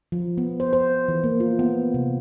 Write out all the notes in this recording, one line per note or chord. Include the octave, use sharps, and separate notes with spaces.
F3
B3
C5
C5
E3
A#3
F4
B3
C3